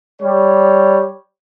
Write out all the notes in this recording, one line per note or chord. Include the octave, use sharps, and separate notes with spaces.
G3 C#5